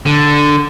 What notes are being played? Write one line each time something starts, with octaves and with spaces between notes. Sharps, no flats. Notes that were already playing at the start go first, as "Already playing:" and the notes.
D3